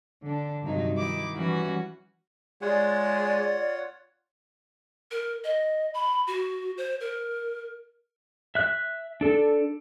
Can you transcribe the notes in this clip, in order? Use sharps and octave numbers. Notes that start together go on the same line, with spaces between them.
D3 D4
G2 C3 D#3 F#3 D#4
D#3 E4 D6
E3 G3 C#4 F#4 B4
G#3 F4 C#5 D5 F#5
A#4
D#5
B5
F#4
C5
A#4
E5 F#6
D4 A4